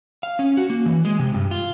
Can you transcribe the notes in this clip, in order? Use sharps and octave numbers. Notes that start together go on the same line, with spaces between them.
F5
C#4
F#4
A#3
E3
G#3
C3
G2
F4